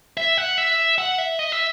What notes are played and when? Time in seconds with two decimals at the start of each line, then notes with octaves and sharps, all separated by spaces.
0.17 E5
0.38 F#5
0.58 E5
0.98 F#5
1.18 E5
1.39 D#5
1.52 E5